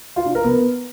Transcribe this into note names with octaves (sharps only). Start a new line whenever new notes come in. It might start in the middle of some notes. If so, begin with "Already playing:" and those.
F4
D4
A#4
B3